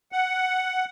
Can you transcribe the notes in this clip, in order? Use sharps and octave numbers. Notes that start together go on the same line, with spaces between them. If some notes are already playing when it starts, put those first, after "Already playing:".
F#5